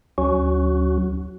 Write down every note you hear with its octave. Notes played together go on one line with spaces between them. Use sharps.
D2 F#3 C#4 F#4